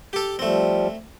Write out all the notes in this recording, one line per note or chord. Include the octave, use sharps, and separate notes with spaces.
G4 A4
F3 G3 A3 C4